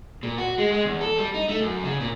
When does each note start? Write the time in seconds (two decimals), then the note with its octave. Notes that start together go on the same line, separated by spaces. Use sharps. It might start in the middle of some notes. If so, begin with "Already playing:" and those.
0.23 A#2
0.38 F#4
0.58 G#3
0.72 G#3
0.85 E2
1.01 A4
1.18 G3
1.34 D#4
1.49 A3
1.61 F#2
1.84 C#3
2.00 A#2